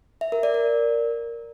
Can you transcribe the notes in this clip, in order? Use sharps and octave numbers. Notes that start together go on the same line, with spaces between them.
E5
A#4
D5
A#4